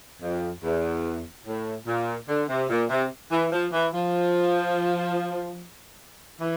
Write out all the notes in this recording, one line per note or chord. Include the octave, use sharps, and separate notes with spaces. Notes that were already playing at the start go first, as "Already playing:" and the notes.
F2
E2
A2
A#2
D3
C3
A#2
C3
E3
F3
E3
F3
E3